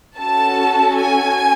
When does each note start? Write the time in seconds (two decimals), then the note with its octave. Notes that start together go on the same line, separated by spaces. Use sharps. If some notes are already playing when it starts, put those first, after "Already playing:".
0.18 C#4 F#4 A4 A5
0.97 G#5